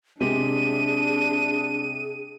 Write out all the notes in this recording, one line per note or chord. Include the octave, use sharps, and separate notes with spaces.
C3 G#3 D4 G4 G#4 D#7